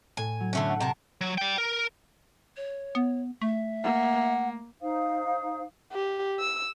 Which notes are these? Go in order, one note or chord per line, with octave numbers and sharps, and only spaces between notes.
A2 G#5
F#3
D3 A3 C#4
F#5 F#6
C3 A#4 A5
F#3
D5 G5
A#4
C#5
B3
A3 E5
A#3 F#5
D#4 C5 F5 D#6
G4
E6